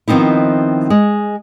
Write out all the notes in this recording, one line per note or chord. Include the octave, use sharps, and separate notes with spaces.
D#3 F3 B3 C4 D#4 E4
G#3